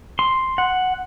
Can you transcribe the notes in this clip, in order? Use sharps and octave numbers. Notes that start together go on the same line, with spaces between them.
C6
F#5